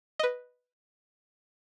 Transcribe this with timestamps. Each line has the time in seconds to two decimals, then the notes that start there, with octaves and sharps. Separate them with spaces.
0.19 B4 D#5